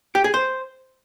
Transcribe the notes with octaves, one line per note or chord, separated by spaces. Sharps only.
G4
G#4
C5